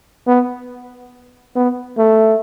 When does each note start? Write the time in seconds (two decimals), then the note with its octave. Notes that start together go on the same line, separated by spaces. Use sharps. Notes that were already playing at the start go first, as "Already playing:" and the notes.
0.27 B3
1.56 B3
1.98 A3